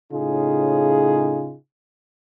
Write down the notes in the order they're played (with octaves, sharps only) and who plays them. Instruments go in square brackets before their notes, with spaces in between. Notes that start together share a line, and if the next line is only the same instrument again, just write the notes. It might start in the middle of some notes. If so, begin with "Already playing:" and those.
[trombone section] A2 C#3 D#4 F4 G#4